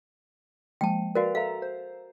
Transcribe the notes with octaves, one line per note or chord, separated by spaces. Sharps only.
F3 G#3 A#3 G5 A5
F#4 A#4 B4 D5 F5
A4 E5 F5 A#5
C5